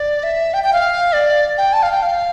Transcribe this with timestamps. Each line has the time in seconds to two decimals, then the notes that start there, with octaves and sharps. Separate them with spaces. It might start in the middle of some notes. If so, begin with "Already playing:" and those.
Already playing: D5
0.23 E5
0.54 G5
0.64 G5
0.73 F5
1.13 D5
1.58 G5
1.73 A5
1.83 F5
1.92 G5
2.02 F5